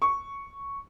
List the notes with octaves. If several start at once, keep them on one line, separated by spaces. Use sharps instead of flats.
C#6